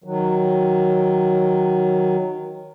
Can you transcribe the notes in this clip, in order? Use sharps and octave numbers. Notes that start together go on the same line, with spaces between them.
D#3 F#3